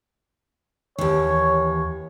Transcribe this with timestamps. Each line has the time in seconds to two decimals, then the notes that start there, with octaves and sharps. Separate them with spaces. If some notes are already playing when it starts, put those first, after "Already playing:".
0.98 D#2 E3 C#5